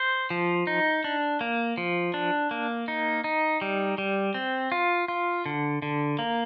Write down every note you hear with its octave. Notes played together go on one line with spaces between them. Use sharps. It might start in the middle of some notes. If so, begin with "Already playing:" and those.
Already playing: C5
F3
D#4
D4
A#3
F3
D4
A#3
D#4
D#4
G3
G3
C4
F4
F4
D3
D3
A#3